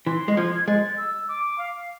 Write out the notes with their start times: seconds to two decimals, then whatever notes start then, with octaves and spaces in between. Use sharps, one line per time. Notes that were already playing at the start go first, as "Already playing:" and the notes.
0.06 E3 C6
0.28 G#3
0.37 F3 G#6
0.67 G#3 A6
0.98 E6
1.28 D6
1.58 F5